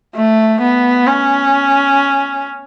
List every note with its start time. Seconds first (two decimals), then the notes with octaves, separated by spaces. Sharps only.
0.15 A3
0.61 B3
1.07 C#4